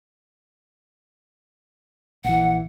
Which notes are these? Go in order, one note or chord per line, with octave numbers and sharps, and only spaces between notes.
A#1 E3 F#5